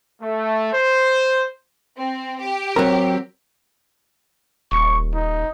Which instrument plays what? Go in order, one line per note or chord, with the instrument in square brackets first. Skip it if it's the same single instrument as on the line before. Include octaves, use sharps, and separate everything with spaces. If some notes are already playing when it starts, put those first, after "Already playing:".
[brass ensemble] A3
C5
[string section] C4
G4
[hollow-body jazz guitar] F#3 A#4 [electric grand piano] C4
[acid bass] D#1 [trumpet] C#6
[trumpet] D#4